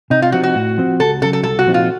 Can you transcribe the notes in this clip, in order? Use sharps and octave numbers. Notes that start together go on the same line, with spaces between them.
C3 D#4
F4
F3 C4 D#4 F#4
F#4
A2
F3 C4
C#2 A4
C#3 F#3 A4
A4
C2 A4
F#4
A#2 F3 C4 D#4
F4